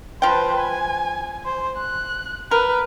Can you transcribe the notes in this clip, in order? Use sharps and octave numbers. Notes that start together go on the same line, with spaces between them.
F3 B4 C5 G5
G#5
C5
F#6
A#4 B4